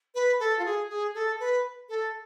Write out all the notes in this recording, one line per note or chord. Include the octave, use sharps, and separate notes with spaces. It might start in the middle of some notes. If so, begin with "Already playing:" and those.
B4
A4
F4
G#4
G#4
A4
B4
A4